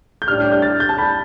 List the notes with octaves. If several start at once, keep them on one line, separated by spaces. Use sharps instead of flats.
G6
A2 G3 D4 G4 D5 F6
G6
A6
G6
A5
B5